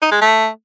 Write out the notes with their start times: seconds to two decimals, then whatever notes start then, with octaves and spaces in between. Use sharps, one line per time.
0.02 D#4
0.11 G#3
0.21 A3